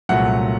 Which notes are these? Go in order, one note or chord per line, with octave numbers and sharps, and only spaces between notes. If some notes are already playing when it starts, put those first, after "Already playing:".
C2 A#2 F#3 A3 F#5